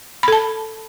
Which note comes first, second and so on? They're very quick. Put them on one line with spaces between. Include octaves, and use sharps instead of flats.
B5 A4 A5